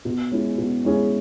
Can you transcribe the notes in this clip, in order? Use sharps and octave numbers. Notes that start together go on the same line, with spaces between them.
B2
G#3 C#4 E4 G#4
B2
G#3 C#4 E4 G#4